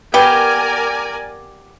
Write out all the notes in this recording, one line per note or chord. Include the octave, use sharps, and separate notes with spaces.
B3 G4 A#4 D5 G#5